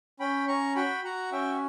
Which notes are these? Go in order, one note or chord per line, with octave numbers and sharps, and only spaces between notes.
C#4 G5 B5
C#4 A#5 C#6
F#4 G5 B5
F#4 F#5 A#5
C#4 E5 G5